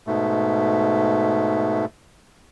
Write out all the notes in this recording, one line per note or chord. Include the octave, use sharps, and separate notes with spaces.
G#2 B2 A3